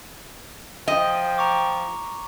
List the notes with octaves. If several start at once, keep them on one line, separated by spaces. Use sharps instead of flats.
F3 D#5 G5
A#5 C#6 D6